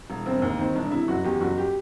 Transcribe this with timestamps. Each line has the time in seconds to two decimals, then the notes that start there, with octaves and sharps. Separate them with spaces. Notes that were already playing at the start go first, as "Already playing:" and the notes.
0.10 E1
0.26 E1 C4
0.42 D#2
0.59 D#3 C4
0.75 E1 D4
0.91 C3 E4
1.08 F#1 F#4
1.24 E2 G4
1.41 F#1 F#4
1.58 G4